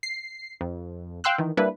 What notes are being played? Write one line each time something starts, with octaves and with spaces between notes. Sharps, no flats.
C7
F2
F5 G5 C6 E6 F#6
D#3 E3
G3 A#3 D4 E4 B4